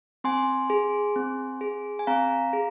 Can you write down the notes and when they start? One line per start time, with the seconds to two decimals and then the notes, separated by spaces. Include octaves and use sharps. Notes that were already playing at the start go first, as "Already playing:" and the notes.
0.24 C4 G#5 C6
0.70 G#4
1.16 C4
1.61 G#4
1.99 G#5
2.07 C4 F5 A#5
2.53 G#4